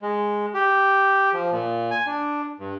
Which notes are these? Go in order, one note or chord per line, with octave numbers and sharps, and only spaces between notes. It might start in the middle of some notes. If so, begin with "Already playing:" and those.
G#3
G4
F3
A#2
G#5
D4
G2